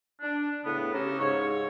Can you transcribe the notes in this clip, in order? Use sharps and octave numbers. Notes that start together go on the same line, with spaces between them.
D4
A2 C#3 B3
C#4 G4 A4 A#4
G#2 C#3 C#5